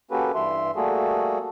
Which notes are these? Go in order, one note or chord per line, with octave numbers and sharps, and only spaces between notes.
A#3 C#4 F#4 G4 A4 B4
G2 E3 E5 C6
G3 A3 A#3 F#4 G#4 A4